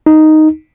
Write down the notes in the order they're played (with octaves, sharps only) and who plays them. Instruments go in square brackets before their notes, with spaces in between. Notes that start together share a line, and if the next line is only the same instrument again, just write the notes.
[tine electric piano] D#4